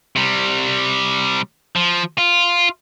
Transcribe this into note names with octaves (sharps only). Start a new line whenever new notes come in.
C3 G3
F3
F4